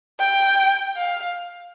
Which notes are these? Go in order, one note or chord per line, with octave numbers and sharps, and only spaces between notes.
G5
F5